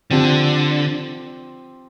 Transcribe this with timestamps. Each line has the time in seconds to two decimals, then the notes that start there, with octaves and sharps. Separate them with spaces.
0.11 D3 F3 C4 G4